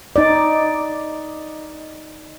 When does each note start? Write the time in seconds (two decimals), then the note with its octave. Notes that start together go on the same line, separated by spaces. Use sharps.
0.16 D#4 D5